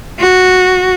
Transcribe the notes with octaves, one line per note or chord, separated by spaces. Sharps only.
F#4